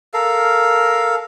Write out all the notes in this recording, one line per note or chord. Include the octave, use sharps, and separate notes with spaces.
A4 A#4 F5